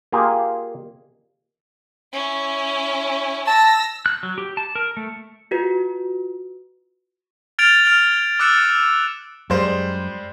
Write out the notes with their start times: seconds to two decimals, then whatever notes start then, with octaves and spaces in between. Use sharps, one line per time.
0.12 A#3 F4 G4 G#4 G#5
2.13 C#4 E4
3.47 A5 E6 A#6
4.06 F#6
4.23 F#3
4.38 G4
4.57 A5
4.75 A#4
4.97 A3
5.51 F4 F#4 B4
7.59 F6 G#6 A6 D7 F7 G7
7.84 F6 D7 F7
8.39 D6 E6 F#6 A6 C#7 E7
9.50 F#2 G3 G#3 C5